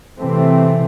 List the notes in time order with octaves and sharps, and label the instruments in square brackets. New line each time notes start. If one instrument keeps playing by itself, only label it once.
[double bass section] C3 E3 A3 C4